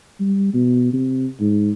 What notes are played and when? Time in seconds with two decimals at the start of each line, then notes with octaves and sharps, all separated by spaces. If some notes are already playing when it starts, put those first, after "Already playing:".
0.20 G3
0.54 B2
0.93 C3
1.40 G#2